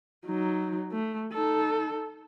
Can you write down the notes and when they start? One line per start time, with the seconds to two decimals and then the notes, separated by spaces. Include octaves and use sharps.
0.26 F#3 D#4
0.92 A3
1.32 D#4 A4